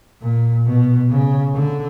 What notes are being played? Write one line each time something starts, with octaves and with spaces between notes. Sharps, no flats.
A#2
B2
C#3
D3